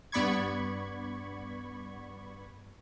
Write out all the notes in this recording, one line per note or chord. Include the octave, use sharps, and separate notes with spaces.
G2 B3 D5 B5 C#6 G#6